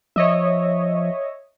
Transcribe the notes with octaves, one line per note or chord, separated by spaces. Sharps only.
F3 C#5 D#5 E5